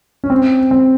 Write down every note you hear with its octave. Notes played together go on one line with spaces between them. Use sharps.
C#4
C4
C4